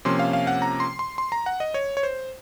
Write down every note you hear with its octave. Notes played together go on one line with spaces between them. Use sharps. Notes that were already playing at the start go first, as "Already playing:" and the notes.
C3 F3 A#3 C#4 C6
F5
F5
F#5
A#5
C6
C6
C6
A#5
F#5
D#5
C#5
C#5
C5